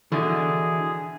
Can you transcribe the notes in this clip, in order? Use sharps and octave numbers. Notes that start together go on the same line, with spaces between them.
B2 D3 E3 D4 E4 G#4